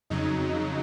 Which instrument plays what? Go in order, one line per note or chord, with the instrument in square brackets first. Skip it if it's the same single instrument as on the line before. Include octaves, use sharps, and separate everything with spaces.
[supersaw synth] F2 C#3 F#3 D#4